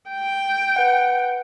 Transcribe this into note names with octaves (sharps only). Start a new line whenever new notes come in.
G5
B4 F#5